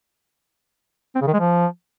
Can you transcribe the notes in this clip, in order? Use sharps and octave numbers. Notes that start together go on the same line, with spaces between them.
C4
C#3
D#3
G#3
F3